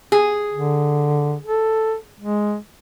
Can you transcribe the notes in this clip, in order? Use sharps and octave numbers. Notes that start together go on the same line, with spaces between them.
G#4
D3
A4
G#3